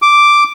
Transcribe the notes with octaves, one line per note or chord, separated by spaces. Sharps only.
D6